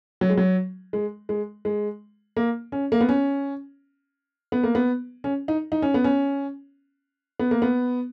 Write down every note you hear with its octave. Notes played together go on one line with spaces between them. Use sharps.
F#3
G#3
F#3
G#3
G#3
G#3
A#3
C#4
A#3
B3
C#4
B3
A#3
B3
C#4
D#4
D#4
C#4
B3
C#4
B3
A#3
B3